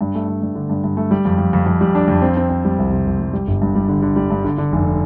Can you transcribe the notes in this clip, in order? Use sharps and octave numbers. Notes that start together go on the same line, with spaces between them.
G2
A3
G2
G2
D3
G2
G2
A3
G3
F2
F2
F2
F2
G3
D4
F2
C4
C4
C4
G3
C2
C3
C2
G3
G3
G1
G2
G3
D3
D3
G3
G2
D3
D3
F1